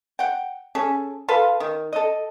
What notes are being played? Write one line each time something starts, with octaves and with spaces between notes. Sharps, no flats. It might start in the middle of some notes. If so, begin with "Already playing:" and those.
F#5 G5
C#4 G#4 A4
F4 A4 B4 F5
D#3
A4 D#5